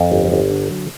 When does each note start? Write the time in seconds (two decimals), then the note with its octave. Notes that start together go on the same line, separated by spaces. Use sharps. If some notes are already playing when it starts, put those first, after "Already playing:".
Already playing: F2
0.12 G1
0.32 G1
0.51 D3
0.70 F#3